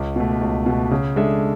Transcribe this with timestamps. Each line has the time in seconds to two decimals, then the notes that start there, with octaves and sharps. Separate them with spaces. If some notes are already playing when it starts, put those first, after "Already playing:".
Already playing: C#2
0.16 B2 A3
0.41 C#2
0.66 B2 A3
0.91 C#3
1.16 G#3 D4 A4 E5